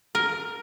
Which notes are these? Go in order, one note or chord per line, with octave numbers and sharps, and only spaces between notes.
A#4